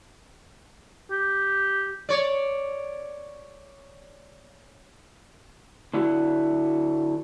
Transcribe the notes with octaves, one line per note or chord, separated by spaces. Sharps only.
G4
C#5 D5
D3 D4 E4 F#4